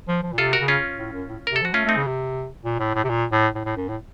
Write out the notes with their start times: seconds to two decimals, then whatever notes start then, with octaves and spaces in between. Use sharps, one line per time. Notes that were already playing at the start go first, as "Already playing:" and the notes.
0.08 F3
0.23 F3
0.33 A#2
0.38 C3 F4 A4
0.53 F#4 A#4
0.61 C#3
0.68 C#4 F4
0.98 A2
1.13 F#2
1.29 A2
1.47 A#4
1.51 C3
1.56 A4
1.62 F3 F#4
1.73 A3 C#4 F4
1.85 A3
1.89 C4 D#4
1.96 C#3
2.07 C3
2.65 A#2
2.80 A2
2.95 A2
3.04 C3
3.09 A#2
3.32 A2
3.55 A2
3.65 A2
3.77 F#2
3.88 A2